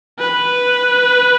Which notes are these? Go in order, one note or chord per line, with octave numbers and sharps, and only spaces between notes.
B4